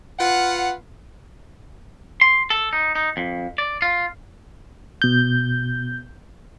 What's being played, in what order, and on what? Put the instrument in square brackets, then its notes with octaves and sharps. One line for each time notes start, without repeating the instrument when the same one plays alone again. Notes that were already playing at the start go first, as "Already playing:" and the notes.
[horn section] F4 B4 F5 F#5
[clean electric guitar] C6
A4
D#4
D#4
F2
D5
F4
[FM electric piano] B2 G6